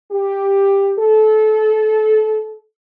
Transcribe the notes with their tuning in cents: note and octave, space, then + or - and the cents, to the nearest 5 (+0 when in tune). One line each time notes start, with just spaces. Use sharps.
G4 +10
A4 -25